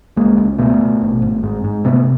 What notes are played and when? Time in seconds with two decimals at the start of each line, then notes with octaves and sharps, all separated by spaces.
0.16 C#2 G#3 A#3
0.38 C#2
0.58 B2 A3 B3
0.80 B2
1.01 G#1
1.22 G#1
1.43 G#2
1.64 G#2
1.85 C3 A3 B3